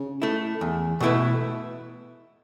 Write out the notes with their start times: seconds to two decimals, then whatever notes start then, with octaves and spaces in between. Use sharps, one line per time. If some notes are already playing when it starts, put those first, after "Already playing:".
Already playing: C#3
0.22 A3 E4
0.61 E2
1.00 B2 A3 E4 B4